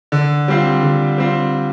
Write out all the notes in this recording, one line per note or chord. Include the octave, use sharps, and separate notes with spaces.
D3
G3 C4 F4
D3
G3 C4 F4